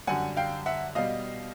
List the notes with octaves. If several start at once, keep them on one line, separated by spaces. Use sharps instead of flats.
F#2 D3 G3 F#5 G#5
F5 G5
E5 F#5
B2 G3 D#5 F5